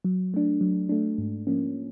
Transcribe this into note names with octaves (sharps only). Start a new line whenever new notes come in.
F#3
A3 D4
F#3
A3 D4
G#2
F3 A#3 C#4